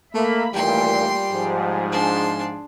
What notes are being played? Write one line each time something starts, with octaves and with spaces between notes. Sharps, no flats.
A3 A#3 E5 B5
D#2 A#2 E3 G3 A3 G5 C6
G#2 F3 G#4
D4 C6